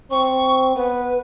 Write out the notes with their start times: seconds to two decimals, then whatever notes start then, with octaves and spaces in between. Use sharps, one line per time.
0.11 C4 C#6
0.76 B3 B4